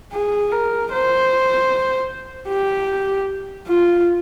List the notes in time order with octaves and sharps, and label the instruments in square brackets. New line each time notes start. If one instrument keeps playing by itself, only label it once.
[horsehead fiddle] G#4
A#4
C5
G4
F4